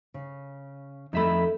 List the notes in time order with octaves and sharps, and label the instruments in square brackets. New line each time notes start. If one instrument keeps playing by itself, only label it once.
[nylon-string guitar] C#3
[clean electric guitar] F2 E5 B5 [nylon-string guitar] A3 D#4